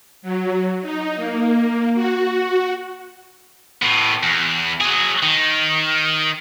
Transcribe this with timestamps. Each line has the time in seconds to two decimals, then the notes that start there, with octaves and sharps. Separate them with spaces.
0.22 F#3
0.82 D#4
1.15 A#3
1.95 F#4
3.82 A2 B3
4.23 E2
4.81 F#3 G#4
5.23 D#3